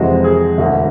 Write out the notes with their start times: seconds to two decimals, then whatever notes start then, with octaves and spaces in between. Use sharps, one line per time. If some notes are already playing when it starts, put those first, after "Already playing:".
Already playing: F2 C3 E3 G#3 C4 F#4
0.24 G#4
0.58 E1 D2 D3 F#4